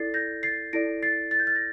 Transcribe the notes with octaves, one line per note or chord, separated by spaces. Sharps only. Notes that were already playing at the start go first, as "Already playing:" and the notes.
Already playing: E4 A4 D5 A6 C7
G6 A#6
A6 C7
E4 A4 D5 A#6 D7
A6 C7
A6
G6
F6 A6
A#6